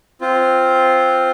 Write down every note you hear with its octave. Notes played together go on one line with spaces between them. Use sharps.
C4 F4